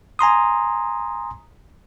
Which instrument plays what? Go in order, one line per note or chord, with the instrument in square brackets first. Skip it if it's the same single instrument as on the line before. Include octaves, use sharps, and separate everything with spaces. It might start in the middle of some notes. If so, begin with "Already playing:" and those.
[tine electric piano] G#5 A#5 C6 D#6